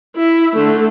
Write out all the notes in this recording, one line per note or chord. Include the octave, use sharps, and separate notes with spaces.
E4
D3 A3